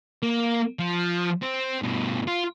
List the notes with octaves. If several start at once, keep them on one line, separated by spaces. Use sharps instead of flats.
A#3
F3
C4
G2 B2
F4